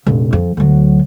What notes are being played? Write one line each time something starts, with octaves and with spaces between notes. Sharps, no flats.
F1 A#1
F2
D2 F#3